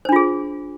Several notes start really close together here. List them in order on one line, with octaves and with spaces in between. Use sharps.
C5 D4 F4 G#4